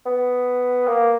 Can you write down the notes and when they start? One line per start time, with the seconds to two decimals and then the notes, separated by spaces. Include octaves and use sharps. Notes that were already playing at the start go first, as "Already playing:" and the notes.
0.06 B3
0.87 A#3